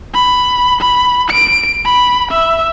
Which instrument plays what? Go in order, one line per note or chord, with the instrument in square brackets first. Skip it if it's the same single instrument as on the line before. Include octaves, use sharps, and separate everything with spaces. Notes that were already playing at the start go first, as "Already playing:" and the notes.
[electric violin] B5
B5
D7
B5
E5